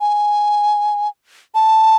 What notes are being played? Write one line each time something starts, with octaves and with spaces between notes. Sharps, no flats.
G#5
A5